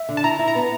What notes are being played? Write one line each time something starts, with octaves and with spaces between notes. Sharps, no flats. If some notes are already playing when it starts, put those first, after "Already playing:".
Already playing: E5
D3
A5
E4 A#5
E4
A#5
B3